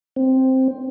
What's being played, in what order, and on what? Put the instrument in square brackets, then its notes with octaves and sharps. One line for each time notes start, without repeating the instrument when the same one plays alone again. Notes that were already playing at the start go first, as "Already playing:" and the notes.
[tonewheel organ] C4